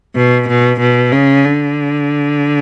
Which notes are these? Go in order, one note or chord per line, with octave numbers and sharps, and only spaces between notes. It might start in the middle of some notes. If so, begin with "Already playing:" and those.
B2
B2
B2
C#3
D3